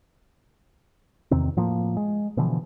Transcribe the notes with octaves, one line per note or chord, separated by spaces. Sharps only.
E2 C3 D#3 C4
A2 F3 A#3
G#3
B2 D3 E3 F3